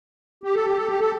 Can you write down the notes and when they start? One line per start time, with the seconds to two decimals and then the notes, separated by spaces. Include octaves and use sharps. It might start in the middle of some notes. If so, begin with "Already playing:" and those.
0.44 G4
0.55 A4
0.66 G4
0.77 A4
0.88 G4
1.00 A4